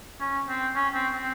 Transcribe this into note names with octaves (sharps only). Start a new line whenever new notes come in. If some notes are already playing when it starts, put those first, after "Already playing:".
C#4
C4
C#4
C4
C4